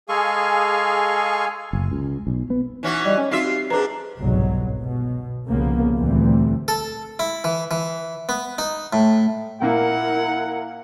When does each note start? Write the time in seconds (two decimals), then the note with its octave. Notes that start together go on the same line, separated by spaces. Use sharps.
0.09 G#3 G#4 A4 F5 G#5 C#6
1.73 F#1
1.91 C#2
2.27 B1
2.50 B3
2.83 E3 C#4 D#4 F#4
3.05 G3 D5 D#5
3.18 C#4
3.31 C4 D#4 F4 F#4 E5 C7
3.44 G4
3.70 G#2 D4 G#4 A4 B4 A#5
4.17 G1 C2 G#2 B2 F#3
4.79 B2
5.46 C2 C#3 F3 A#3 B3
5.96 D2 A#2 E3 G3 A3 C4
6.68 A4
7.19 E4
7.44 E3
7.71 E3
8.29 B3
8.58 D#4
8.93 A2
9.62 A#2 A#3 E4 A#4 F#5